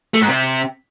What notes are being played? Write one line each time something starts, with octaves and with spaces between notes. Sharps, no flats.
A3
G#2
C3